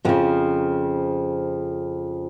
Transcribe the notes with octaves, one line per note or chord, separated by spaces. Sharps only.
F2 C#3 F3 F#3